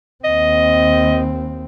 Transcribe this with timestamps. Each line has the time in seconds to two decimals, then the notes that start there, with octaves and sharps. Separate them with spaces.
0.24 D#2 C4 D#5